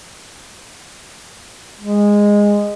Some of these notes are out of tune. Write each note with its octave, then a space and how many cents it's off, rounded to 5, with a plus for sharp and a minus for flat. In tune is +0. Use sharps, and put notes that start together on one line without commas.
G#3 -15